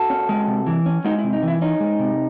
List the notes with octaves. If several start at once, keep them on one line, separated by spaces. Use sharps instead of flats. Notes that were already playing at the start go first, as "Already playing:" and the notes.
Already playing: F#4 A4
C#4
G#3
C3
E3
C#4
G#3 D#4 F#4
E4
C3
D#4
E3 E4
C#4 D#4
G#3
C3